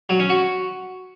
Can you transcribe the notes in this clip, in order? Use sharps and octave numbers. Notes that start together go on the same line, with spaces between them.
F#3
C#4
F#4